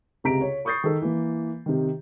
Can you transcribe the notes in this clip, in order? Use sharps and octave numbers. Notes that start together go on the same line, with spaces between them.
C#2 C3 A#5 B6 D7
C#5
B5 C#6 D#6 G6 A6 C7
D#3 A4
E3 A#3
C3 D#3